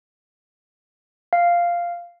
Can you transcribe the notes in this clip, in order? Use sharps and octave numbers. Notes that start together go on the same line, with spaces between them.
F5